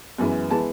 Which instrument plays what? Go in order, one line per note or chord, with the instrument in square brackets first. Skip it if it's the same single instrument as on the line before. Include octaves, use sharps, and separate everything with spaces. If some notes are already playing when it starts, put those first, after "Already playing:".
[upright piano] F#2 E3 G#3 B3
E3 G#3 B3 A5